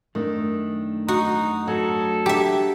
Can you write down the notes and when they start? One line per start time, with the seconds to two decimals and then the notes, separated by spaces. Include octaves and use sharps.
0.15 F#2 D#3 A3 D4
1.08 D#4 F#4
1.67 F#3 A4
2.26 D4 G4 E5 F#5 A#5